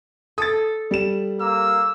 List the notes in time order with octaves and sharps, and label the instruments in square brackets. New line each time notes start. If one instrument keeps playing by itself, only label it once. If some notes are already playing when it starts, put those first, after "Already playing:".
[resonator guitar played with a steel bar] A4 [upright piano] D#6 A6
[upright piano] G3 E7
[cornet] A#3 [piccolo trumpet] E6